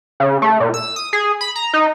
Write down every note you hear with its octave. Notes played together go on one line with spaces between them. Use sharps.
C#3
A3
A#2
E6
D#6
G#4
B5
A#5
D#4